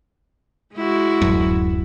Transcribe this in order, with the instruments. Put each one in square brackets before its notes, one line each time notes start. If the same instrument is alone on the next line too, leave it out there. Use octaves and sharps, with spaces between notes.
[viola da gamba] G#3 E4 F#4
[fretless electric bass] D1 F#2